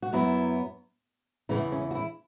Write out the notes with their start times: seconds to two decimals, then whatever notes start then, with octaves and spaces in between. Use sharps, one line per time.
0.02 F#4
0.13 F#2 F#3 B3 E4
1.49 E2 C#3 E3 C#4
1.72 C#4
1.91 F#4
1.95 E4